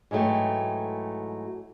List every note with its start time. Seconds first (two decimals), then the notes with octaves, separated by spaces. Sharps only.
0.11 G#2 E3 F#3 A3 G5